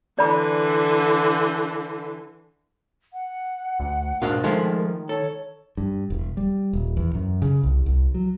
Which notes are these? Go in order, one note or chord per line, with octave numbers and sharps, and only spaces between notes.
D3 E3 D5 B5
F#5
D2
G#2 B2 D4 A#4 F5
D#3 F3 G#3 A3
A4 C#5
G2
E1
G3
D#1
E2
F#2
C#3
C2
C2
F#3